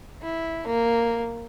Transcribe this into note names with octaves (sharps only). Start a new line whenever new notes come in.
E4
A#3